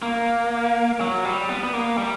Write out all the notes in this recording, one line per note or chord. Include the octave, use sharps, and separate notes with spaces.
A#3
F#3
G3
B3
B3
A#3
G3